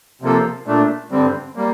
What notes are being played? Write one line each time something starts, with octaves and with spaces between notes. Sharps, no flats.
C3 F3 A#3 F4 A4
A#2 A3 D4
G2 D3 G3 C4
G3 A#3